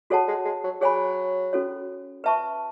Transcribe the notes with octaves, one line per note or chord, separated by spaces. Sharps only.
G#3 F#4 A4 C#5 F#5 A5
G#3
G#3
F#3
F#3 G#4 C#5 G#5 B5
C#4 F#4 A4 C#5
B4 E5 A5 C#6